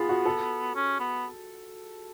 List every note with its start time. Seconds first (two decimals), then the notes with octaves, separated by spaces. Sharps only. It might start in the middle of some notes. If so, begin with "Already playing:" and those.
Already playing: B3 F4 G#4
0.09 F#4
0.25 A4
0.75 C#4
1.00 B3